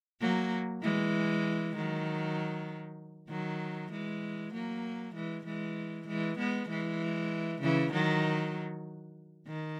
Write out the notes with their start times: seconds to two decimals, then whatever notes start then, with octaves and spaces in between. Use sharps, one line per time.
0.21 F#3 A#3
0.82 E3 G#3
1.75 D#3 F#3
3.29 D#3 F#3
3.92 E3 G#3
4.53 F#3 A#3
5.15 E3 G#3
5.46 E3 G#3
6.07 E3 G#3
6.39 G#3 B3
6.69 E3 G#3
7.61 C#3 E3
7.92 D#3 F#3
9.47 D#3